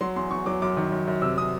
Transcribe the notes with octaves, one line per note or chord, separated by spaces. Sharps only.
F#3 C6
E2 C6
E2 C#6
F#3 D6
F#2 D6
D#3
F#2
F#2
C3 E6
C3 D#6